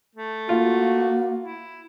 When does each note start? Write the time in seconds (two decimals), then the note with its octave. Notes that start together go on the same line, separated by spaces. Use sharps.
0.16 A3
0.49 A#3 F4 F#4
1.38 E4